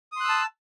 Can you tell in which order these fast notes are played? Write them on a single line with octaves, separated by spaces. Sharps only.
D#6 C6 F#6 E6 A5